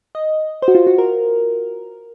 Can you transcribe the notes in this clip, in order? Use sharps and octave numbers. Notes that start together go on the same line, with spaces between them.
D#5
C5
F#4
F4
F#4
A#4